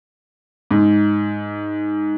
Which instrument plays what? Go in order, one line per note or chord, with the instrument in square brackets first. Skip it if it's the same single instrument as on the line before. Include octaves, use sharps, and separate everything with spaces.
[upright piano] G#2